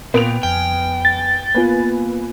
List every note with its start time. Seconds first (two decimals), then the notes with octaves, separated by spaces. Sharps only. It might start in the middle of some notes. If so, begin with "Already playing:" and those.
0.14 A#2 B3 G5 D7 F7
0.43 F2 G5 G#5 F6
1.05 A6
1.55 A#3 B3 F4 B4 G#5